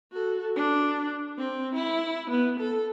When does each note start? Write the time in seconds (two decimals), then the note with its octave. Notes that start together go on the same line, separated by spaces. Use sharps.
0.12 F#4 A4
0.56 D4
1.38 C4
1.75 E4
2.30 B3
2.60 A4